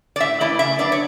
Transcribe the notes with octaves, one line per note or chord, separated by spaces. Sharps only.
D5
A2 E5
E3 A3 E4 D5
C#3 E5
F#3 B3 D4 D5
C#5